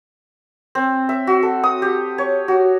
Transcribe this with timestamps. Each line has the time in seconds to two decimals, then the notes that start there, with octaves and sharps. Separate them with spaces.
0.75 C4
1.09 E5
1.27 F#4
1.43 A4
1.64 D#6
1.82 G4
2.18 C#5
2.48 F#4